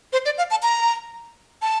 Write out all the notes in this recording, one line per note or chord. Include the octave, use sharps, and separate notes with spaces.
C5
D5
F5
A5
A#5
A5